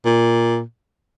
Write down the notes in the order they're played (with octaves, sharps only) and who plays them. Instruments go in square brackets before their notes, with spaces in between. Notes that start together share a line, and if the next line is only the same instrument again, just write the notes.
[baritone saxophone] A#2